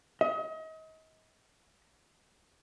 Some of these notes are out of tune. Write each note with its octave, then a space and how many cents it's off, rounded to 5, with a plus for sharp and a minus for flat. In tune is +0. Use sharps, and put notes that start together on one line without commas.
D#5 +35